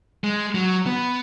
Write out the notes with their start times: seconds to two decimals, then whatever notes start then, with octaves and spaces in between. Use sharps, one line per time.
0.24 G#3
0.55 F#3
0.86 B3